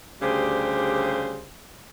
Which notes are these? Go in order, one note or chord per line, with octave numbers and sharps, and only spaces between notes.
D2 C#3 G3 G4 G#4 C5